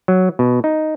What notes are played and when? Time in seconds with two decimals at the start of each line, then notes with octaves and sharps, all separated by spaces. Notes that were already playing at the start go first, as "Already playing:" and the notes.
0.08 F#3
0.39 B2
0.64 D#4